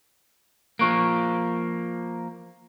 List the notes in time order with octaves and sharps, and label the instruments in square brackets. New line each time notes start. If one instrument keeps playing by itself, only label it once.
[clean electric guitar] F3 A#3 [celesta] C#6 F#6 D7